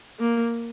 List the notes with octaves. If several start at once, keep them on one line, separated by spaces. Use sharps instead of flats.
A#3